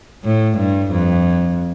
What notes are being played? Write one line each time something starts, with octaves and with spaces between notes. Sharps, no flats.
A2
G2
F2